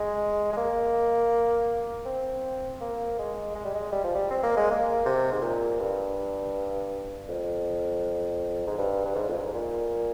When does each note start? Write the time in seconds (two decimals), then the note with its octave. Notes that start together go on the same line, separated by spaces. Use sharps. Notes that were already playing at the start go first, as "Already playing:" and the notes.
Already playing: G#3
0.53 G#3
0.57 A#3
2.05 C4
2.81 A#3
3.18 G#3
3.55 G#3
3.65 G3
3.75 G#3
3.92 G3
4.04 F3
4.15 G3
4.31 C4
4.43 A#3
4.57 G#3
4.71 A#3
5.05 C3
5.32 G#2
5.41 A#2
5.79 G2
7.29 F2
8.67 G#2
8.78 G2
9.05 G2
9.15 G#2
9.28 F2
9.37 G2
9.45 G#2
9.54 A#2